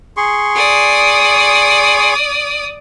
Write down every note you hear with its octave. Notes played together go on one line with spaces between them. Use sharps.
G#4 C6 C#6
D5 D#6